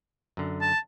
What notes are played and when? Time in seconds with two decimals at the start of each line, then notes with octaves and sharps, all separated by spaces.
0.37 F#2 D3
0.61 A5